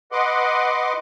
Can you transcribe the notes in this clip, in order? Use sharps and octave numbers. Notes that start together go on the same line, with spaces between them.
B4 D#5 F#5 C6 D6